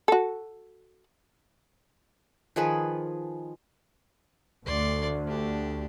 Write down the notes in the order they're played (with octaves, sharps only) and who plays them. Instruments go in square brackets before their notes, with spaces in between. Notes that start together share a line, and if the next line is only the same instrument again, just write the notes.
[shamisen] F#4 A4
[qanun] D#3 F3 G#4 B4
[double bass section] D2 [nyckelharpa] D5 C6
[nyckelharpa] D4 G4